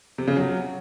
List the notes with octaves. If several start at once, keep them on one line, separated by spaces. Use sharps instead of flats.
C3
C#3
F#3